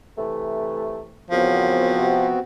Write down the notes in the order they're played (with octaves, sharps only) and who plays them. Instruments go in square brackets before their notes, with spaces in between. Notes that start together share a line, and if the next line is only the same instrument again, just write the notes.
[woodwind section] C3 E3 A3
[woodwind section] E2 A#2 C#3 [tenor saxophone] F3 [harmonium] B3 C4 F#4
[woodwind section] C3